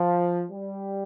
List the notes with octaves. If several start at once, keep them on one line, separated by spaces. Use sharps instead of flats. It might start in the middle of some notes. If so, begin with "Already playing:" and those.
Already playing: F3
G3